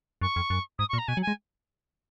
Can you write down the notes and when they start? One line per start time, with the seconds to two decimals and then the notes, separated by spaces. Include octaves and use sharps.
0.21 F#2 C#6
0.36 F2
0.50 F#2
0.79 G#2 D#6
0.89 C#6
0.93 A#2
0.98 A#5
1.08 B2 G#5
1.17 F#3
1.22 G#5
1.27 G#3